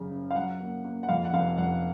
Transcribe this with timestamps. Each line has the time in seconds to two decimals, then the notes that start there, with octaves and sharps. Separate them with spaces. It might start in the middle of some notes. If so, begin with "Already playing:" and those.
Already playing: F#2 C#3
0.11 F#1
0.31 F5
0.35 F#3 F#5
0.60 A#3
0.84 A#3
1.03 F#5
1.09 F2 F5
1.25 F#5
1.33 F1 F5
1.58 F2 F#5